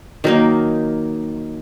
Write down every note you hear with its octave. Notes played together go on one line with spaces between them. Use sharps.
D#3 F#3 A#3 D#4